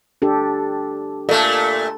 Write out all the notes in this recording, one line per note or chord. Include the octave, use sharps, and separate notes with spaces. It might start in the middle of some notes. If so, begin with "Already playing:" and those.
D4 G4 A4
A#2 A3 A4